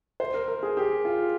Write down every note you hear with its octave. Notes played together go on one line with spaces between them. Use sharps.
C5
A#4
A#4
G#4
G4
F4